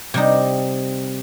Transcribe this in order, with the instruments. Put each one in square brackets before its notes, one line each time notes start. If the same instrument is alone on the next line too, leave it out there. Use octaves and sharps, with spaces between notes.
[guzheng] C3 G3 D#4